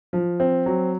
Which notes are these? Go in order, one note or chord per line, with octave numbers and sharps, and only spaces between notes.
F3
C4
F#3